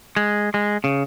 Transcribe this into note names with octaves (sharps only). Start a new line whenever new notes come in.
G#3
G#3
C#3